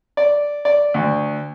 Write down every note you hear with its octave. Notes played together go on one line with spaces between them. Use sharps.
D5
D5
D2